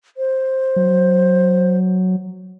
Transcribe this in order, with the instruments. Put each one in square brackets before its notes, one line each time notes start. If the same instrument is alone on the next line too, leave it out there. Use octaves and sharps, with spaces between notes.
[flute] C5
[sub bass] F#3